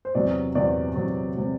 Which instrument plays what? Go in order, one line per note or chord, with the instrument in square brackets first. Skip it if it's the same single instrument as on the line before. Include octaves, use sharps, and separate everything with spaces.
[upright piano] C5
E2 C3 F#3 D5
E2 C3 F#3 D5
E2 C3 F#3
C3 F#3